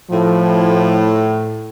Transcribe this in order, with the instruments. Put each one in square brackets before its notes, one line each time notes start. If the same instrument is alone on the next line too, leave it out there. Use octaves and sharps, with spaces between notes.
[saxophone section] A2 [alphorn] F3